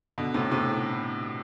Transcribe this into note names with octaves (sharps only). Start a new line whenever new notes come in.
B2 D3
A2 C3
A2 C3